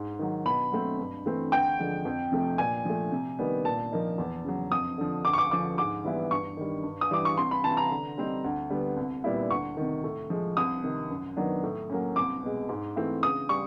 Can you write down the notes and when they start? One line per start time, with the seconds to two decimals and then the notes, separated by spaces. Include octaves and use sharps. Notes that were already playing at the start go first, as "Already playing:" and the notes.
Already playing: G#2
0.19 D#3 F#3
0.46 B2 B5
0.72 F#3 A3 C4
0.99 G2
1.26 E3 A3 C4
1.52 D2 G5
1.79 D3 F3 G#3
2.05 F2
2.32 C3 F3 A3
2.58 A#2 G#5
2.85 F3 A3
3.12 C3
3.39 D#3 G3 B3
3.65 A#2 A5
3.92 F3 A#3 D#4
4.18 E2
4.45 C#3 F#3
4.71 F2 D#6
4.98 D3 F3
5.25 D2 D6
5.33 C#6
5.38 D6
5.51 D3 F3 D6
5.78 G#2 D6
6.04 E3 G3 B3 E4
6.31 G2 C#6
6.57 D#3 G3
6.84 G2
7.01 D#6
7.11 E3 G3 D6
7.25 C#6
7.37 C2 C6
7.51 B5
7.64 C3 E3 A5
7.77 A#5
7.91 D3
8.18 G3 C4 D#4
8.44 D2
8.70 D3 G3 B3
8.97 C2
9.24 A#2 G3 B3 E4
9.50 D2 C#6
9.77 C3 D#3
10.04 A2
10.30 F3 G#3
10.57 C2 D#6
10.83 C3 D#3
11.10 F#2
11.37 D#3 F#3 B3 D4
11.63 A2
11.90 F#3 A#3 C#4
12.16 C2 D6
12.43 B2 G#3
12.69 G#2
12.96 E3 A3 C4 E4
13.23 C#3 D#6
13.49 G3 C#6